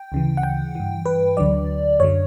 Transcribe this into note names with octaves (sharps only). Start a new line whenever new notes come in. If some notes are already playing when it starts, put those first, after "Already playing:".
Already playing: G5
D2 C#3 E3
F#5
G5
G2 E3
B4
D2 D3 F#3 D5
F#2 D3 F#3 C#5